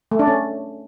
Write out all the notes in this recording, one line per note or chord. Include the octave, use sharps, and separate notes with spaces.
A3
D4
C#4